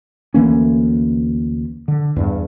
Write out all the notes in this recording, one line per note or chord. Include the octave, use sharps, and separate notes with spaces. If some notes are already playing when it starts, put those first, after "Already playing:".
D2 E3 A#3 C#4
D3
E2 G2